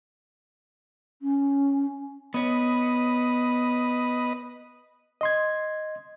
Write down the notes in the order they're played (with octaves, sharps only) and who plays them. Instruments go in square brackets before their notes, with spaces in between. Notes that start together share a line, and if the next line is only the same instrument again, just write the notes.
[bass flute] C#4
[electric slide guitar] B3 C#5 [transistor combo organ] B4 D#5
[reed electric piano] D#5 C6 G#6